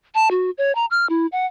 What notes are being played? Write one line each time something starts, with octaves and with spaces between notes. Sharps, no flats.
A5
F#4
C#5
A#5
F6
E4
F#5